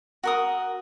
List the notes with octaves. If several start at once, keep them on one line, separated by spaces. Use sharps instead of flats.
F#4 A#4 D#6